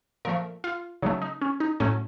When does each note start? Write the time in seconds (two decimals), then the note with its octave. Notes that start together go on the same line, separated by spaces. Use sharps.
0.25 A#2 F3 A3 A#4
0.64 F4
1.02 C#3 F#3 A3 D#4
1.22 D#4
1.42 C#4
1.60 D#4
1.80 A2 F#3 A3 C#4